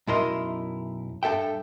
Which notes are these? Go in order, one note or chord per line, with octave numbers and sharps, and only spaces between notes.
B1 F#2 E4 A#4 D#5 C6
G2 A4 E5 G5